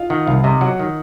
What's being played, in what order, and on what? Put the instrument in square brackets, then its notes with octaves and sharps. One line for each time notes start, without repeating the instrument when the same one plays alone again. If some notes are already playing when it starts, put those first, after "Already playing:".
Already playing: [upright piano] F4 D#5 F5
[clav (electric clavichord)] D#3 [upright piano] F#5
[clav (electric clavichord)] C2 [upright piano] F5
[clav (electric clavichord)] C3 [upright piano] D#5
[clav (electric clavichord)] F#3 [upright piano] F#5
[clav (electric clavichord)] D#3